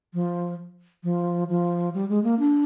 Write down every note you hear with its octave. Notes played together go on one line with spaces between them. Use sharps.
F3
F3
F3
G3
G#3
A#3
D4